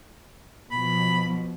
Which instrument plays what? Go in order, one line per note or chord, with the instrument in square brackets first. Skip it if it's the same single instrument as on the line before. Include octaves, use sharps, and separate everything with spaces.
[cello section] B2 F3 [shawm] B5